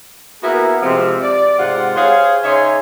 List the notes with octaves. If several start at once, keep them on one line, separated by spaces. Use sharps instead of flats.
A#3 B3 E4 F#4 G#4 A#4
C3 F3 G#3 C4
D5
G#2 C3 F4 F#5
G#4 C5 C#5 F5
C#3 D#4 C#5 E5 G#5 C6